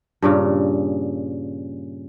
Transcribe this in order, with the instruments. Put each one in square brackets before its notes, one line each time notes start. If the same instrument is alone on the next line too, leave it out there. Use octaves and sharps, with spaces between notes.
[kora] G2 A#2 C#3